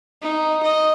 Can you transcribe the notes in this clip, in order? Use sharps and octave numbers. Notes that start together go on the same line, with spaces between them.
D#4
D#5